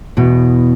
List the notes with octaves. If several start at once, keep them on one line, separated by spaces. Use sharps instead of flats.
E2 B2